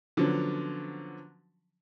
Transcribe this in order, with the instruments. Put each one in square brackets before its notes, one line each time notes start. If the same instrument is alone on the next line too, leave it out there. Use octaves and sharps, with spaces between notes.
[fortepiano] D3 F3 F#3 B3 C#4